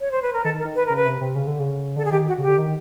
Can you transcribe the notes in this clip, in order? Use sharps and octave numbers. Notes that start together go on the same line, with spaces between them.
C#5
C5
B4
A#4
D#3 A4
D#3
A#4
D#3
B4
C#3 A#4
B4
C3
C3
C#3
D3
C#3
D3 A4
G#4
D#3 G4
F#4
C#3 G4
D3
D#3